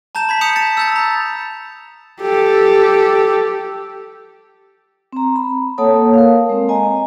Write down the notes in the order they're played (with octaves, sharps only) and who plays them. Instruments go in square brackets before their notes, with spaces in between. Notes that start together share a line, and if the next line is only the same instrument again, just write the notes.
[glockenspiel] A5 A#5 G6 E7
B5 G#6 B6
D#6 G6 C#7 F7
A6 C#7 E7
E6 G6 A6
A#5
[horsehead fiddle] G4 A4
[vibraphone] C4 A#5
B5
A#3 A4 C#5 F#5 A5 D#6
A#4 F5
G#3 C4
D#5 G#5 A#5